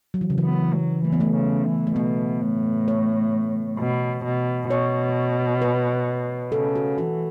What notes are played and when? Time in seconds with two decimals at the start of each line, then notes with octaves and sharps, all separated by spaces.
0.14 F#3
0.21 E3
0.30 C#3
0.38 E3
0.44 B3
0.74 F#3
1.04 E3 A3
1.12 B3
1.20 A3
1.35 C#3
1.66 E3
1.87 A3
1.96 B2 B3
2.42 A2
2.88 C#5
3.79 B2
4.24 B2
4.70 B2 C#5
5.62 B4
6.52 C#3 A4
6.76 F#4
6.98 E3 F#4